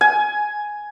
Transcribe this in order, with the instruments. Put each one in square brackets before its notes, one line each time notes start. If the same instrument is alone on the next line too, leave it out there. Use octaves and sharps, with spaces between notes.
[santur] G#5